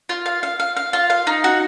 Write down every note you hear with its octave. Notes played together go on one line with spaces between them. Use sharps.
F4
F5
F5
F5
F5
F4
F5
D#4
F#4